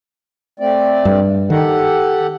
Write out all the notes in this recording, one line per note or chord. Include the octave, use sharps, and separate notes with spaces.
A3 C4 D5
G2
D#3 G4 A4 F#5